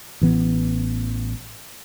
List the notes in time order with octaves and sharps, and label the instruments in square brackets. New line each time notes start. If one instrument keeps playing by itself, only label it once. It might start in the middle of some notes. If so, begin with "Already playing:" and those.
[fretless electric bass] A1 E3 B3